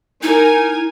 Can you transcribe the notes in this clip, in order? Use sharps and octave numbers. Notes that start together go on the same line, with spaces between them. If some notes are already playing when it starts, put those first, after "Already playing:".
D#4 E4 A#4 G#5